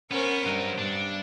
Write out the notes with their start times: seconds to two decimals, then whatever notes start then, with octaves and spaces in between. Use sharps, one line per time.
0.11 B3 C#4 A#4 C5
0.46 G2 F#3 A#4
0.78 G2 D4